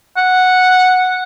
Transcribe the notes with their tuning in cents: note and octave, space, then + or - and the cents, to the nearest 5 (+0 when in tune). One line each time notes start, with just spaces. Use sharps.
F#5 -5